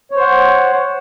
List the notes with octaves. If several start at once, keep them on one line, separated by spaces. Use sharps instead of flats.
C5 C#5 F#5